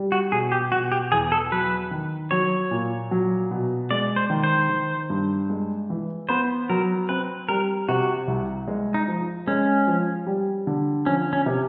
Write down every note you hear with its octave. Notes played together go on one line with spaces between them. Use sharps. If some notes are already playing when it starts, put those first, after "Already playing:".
Already playing: G3
F#4
B2 G#4
G4
B2 F#4
G4
E2 G#4
A4
F#3 B4
D#3
F#3 C#5
A#2
F#3
B2
G#3 D5
C5
D#3
C5
D#3
G2
G#3
E3
B3 C5
F#3 A#4
C4 B4
G3 A#4
C3 F#4
C2
G#3
D#4
F3
G#3 C#4
F3
G3
D3
F3 C#4
C#4
C3